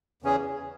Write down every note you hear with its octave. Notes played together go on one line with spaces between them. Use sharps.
E2 C#3 E3 C#4 G#4